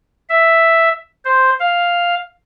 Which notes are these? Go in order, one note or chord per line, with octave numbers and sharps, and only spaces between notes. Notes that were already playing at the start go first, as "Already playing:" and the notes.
E5
C5
F5